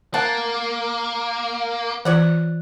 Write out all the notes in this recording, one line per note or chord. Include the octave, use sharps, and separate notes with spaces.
A#3 F#5 A5
E3 F4 C#5 D5 F#5